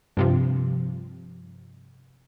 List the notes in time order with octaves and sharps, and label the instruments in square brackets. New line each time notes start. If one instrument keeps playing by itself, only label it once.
[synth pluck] G2 C3 F3